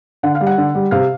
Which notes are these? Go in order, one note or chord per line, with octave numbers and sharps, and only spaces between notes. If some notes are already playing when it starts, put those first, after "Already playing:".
D3 F#5
F5
G3
F#5
D3
G3
C3 F5